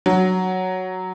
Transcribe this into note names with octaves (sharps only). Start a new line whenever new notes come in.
F#3